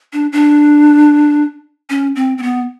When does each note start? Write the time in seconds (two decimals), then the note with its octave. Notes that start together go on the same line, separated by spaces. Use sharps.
0.13 D4
0.33 D4
1.90 C#4
2.16 C4
2.38 C4
2.43 B3